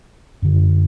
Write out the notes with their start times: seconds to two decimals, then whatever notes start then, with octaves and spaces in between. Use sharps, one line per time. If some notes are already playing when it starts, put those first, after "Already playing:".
0.42 F#2 D3